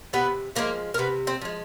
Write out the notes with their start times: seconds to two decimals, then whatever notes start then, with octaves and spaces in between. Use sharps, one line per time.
0.13 C3 B3 B4
0.56 F3 G#3 A#3 A#4
0.94 A#4
0.98 C3 B3 B4
1.27 C4 C5
1.41 F3 G#3